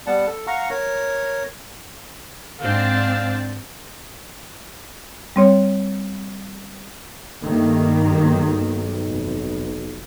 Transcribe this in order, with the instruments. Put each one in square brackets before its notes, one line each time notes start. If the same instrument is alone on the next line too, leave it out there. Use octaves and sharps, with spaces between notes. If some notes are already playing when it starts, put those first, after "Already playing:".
[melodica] G3 B3 F#5 A5
A4
F5 F#5 A#5 C#6
A#4 C#5
[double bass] G#2 [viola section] C4 D4 A5 [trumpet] F5
[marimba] G3 C4 C#5
[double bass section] G2 D#3 A#3 [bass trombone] A3
[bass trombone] B1
[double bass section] F1